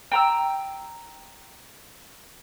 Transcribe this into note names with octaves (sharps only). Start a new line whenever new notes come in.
G5 A#5 E6